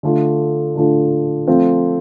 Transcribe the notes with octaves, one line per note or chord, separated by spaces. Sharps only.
D3 A3 D4 F4
D3 A3 D4 F4
F3 A3 C4 F4